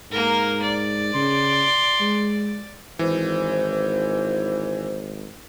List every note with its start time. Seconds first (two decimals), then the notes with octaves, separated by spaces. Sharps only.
0.11 G#2 A#3 A#4
0.62 D5
1.14 C#3 C6
2.00 G#3
2.99 G#1 E3 C5